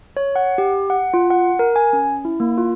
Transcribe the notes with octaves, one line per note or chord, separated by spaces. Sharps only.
C#5
F#5
G4
F#5
F4
F#5
A#4
G#5
C#4
E4
A#3
F4